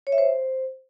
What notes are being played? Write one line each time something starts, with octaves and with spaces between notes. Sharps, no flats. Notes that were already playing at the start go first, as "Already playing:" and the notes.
C#5
E5
C5